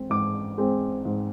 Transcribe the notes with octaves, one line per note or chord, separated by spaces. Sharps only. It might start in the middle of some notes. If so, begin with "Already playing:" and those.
Already playing: G#3 C4
G#2 D6
G#3 C4
G#2